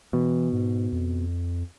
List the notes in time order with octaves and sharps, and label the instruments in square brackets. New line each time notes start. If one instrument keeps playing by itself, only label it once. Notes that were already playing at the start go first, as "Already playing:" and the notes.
[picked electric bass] B2 [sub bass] E3
[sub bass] G#2
F2